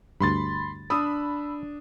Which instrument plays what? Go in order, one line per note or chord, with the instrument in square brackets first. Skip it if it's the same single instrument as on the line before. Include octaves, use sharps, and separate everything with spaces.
[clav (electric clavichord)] D2 G2 [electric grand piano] B5 C6 A6
[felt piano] D4 D#6 [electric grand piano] B5 E6